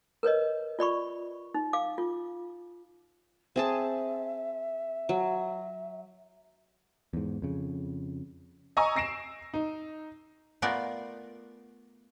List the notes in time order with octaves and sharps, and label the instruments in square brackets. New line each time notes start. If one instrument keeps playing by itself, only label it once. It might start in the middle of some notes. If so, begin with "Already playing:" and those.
[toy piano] A#4 B4 C#5 D#5
F4 D5 B5 C#6
D#4
F5 D6
F4
[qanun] C4 G#4 A5 [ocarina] E5
[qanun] F#3
[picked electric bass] E2 G#2
F2 C#3
[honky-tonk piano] D#5 G#5 A#5 C#6 D#6 E6
E6 A#6 C7 D7 E7
D#4
[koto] A3 B3 F4 A#4 D5